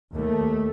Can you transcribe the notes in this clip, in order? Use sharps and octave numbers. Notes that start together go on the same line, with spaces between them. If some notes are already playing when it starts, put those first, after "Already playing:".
D#2 A3